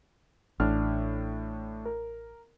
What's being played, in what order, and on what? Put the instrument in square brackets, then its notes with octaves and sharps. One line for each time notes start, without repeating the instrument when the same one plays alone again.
[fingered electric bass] A1 [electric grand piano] A2 D4 F6
[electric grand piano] A#4